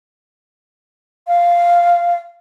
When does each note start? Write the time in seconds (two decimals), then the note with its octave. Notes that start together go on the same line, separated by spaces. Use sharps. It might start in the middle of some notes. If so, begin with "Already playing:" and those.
1.28 F5